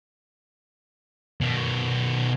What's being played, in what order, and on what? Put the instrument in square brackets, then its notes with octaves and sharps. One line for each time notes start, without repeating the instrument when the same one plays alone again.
[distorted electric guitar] B2 D#3